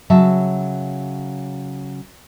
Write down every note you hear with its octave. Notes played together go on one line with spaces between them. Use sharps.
C#3 F#3 E5 A5